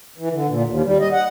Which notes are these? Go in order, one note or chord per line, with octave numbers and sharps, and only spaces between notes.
E3
D3
A#2
D#2
G3
D#5
F#5